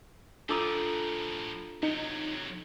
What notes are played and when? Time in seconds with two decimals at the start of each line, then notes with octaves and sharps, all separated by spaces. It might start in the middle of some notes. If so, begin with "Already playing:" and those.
0.49 A2 F3 D4 F4 A4 A#5 D6 D#6
1.83 C3 F#3 D#4